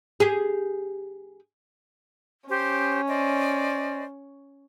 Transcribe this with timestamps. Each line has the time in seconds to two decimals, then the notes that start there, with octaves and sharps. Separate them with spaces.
0.20 G4 G#4
2.49 C#4 G4 C5
3.08 C5 D5 D#5